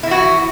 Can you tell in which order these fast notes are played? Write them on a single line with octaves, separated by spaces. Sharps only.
E4 E3 F#4